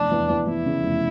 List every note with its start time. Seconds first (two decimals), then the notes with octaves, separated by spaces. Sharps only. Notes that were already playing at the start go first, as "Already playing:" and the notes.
Already playing: F1 E2 D4
0.11 E2
0.29 E2
0.47 E2 E4
0.66 C#3
0.83 F1